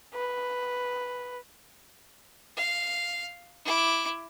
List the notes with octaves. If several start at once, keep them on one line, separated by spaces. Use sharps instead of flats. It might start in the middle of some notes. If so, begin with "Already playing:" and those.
B4
F5
E4 D6